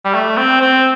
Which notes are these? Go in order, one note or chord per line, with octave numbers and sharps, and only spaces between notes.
G3
A3
C4
C4